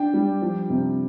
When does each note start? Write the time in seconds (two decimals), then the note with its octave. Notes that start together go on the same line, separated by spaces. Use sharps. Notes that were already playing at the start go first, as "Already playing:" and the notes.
Already playing: D4 G5
0.14 G3
0.42 F3
0.70 C3